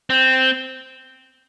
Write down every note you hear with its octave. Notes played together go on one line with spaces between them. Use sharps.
C4